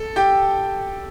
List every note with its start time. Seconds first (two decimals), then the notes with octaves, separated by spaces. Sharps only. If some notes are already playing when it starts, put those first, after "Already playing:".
Already playing: A4
0.16 G4 G5